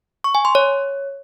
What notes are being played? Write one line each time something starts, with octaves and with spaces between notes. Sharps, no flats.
C#6
G#5
C6
C#5